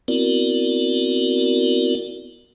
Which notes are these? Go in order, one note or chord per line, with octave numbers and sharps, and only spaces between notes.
B3 C4 E4 F#4 A#4 D5